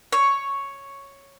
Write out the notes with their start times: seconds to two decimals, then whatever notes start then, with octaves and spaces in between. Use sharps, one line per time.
0.12 C#5